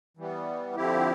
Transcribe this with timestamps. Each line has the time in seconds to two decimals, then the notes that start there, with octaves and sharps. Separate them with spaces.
0.17 E3 G3 B3
0.76 D3 F3 C4 E4 G4